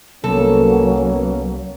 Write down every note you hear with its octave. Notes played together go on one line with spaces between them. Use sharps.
C2 F#3 A#3 B3 C#4 A4